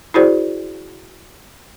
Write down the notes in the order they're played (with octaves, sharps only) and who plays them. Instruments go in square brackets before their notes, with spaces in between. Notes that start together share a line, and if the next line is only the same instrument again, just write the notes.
[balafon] E4 F#4 G#4 C5 D5